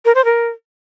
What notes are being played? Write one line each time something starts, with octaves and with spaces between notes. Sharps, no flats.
A#4
C5
A#4